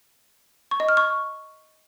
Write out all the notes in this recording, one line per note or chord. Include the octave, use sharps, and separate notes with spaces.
C#6
D#5
F6
C#6